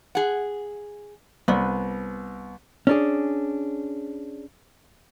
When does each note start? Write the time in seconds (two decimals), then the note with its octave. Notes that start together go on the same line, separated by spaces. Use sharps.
0.15 G#4 F#5
1.48 C2 B3
2.87 C#4 D4 G#4